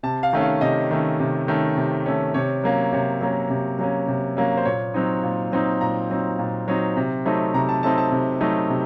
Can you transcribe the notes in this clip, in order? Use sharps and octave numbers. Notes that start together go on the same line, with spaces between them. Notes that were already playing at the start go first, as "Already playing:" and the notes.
C3 A5
F5
D#3 A3 C#4
F5
C3 D#5
D#3 A3 C#4
C3
D#3 A3 C#4
C3
D#3 A3 C#4
C3 C#5
F#3 A#3 C#4
C3 C#5
F#3 A#3 C#4
C3
F#3 A#3 C#4
C3
F#3 A#3 C#4
C5
A#2 C#5
F#3 C4 D#4
A#2
F#3 C4 D#4
A#2 A#5
F#3 C4 D#4
A#2
F#3 C4 D#4
C3
F#3 A3 C4 D#4
C3 A#5
A5
F#3 A3 C4 D#4 A5
A5
C3
F#3 A3 C4 D#4
C3